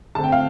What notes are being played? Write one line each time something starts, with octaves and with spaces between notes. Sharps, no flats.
D3 A3 C4 A5
G5
F5